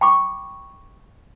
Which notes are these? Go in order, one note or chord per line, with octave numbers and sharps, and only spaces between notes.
G5 B5 C#6 D6